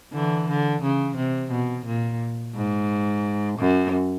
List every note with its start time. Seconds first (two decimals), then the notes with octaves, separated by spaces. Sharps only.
0.13 D3 E3
0.48 D3
0.82 C#3
1.16 C3
1.51 B2
1.86 A#2
2.55 G#2
3.59 F#2